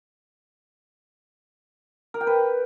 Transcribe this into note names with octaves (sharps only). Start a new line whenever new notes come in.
A#4
G5
B4